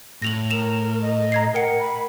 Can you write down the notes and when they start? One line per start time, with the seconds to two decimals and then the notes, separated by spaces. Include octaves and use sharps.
0.22 A2 A#6 F7 F#7
0.51 A#4 E7 F7
1.02 D#5
1.32 A#5 G#6 C7
1.54 A#4 F#5 G5 C#7
1.79 B5